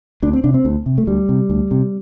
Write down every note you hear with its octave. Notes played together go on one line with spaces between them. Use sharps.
D2 D4
C4
C3 D4
C4
D2
C3
A3
D2 G3
C3
D2
C3